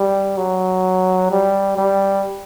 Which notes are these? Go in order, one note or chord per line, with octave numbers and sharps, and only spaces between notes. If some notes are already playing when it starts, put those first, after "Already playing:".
Already playing: G3
F#3
G3
G3